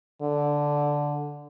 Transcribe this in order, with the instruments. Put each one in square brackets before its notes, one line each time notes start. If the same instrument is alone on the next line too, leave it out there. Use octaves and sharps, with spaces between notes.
[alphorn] D3